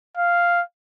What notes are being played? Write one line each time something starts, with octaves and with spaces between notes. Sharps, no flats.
F5